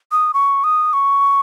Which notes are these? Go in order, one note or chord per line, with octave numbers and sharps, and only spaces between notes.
D#6
C#6
D#6
C#6